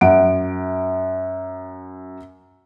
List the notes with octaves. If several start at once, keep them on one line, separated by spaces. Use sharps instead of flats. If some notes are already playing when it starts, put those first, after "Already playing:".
F#2 F#5 D7